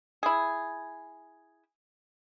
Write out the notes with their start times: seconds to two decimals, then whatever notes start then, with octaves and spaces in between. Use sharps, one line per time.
0.23 E4 G#4